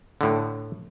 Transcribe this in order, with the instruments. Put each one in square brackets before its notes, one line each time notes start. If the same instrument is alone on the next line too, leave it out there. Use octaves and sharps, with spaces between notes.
[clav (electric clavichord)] A2 D3